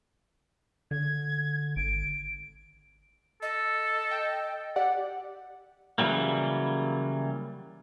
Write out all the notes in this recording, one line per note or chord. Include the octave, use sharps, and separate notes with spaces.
D3 G#6
G#1 D7
A4 D#5
G5
G4 D5 F#5
C#3 E3 F#3 G3 A#3